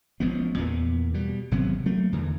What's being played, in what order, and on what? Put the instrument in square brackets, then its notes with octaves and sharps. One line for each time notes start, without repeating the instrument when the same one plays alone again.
[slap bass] A1 F3 G#3 B3
E2 A#2 A#3 B3
B2 G3
G#1 C3 F#3 B3
F#3 A3 A#3
E2 D3 E3